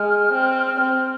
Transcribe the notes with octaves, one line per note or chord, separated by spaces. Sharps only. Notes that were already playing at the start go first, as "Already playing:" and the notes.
Already playing: G#3 F6
C4
C4